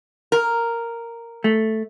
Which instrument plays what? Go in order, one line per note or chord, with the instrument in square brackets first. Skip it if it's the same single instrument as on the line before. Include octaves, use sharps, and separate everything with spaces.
[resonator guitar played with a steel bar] A#4
[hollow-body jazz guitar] A3